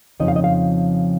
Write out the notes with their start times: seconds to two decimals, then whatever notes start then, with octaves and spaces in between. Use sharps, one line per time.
0.20 F2 C#3 F3 C4 D#4 D#5
0.28 F5
0.36 D#5
0.44 F5